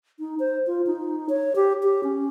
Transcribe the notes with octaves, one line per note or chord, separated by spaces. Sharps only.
D#4
C5
F4
D#4
C#5
G4
G4
C#4